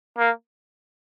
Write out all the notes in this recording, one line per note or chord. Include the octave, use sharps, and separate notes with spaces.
A#3